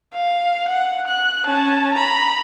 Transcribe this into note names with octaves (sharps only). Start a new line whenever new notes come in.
F5
F#5
F#6
C#4 A5
A#5 B5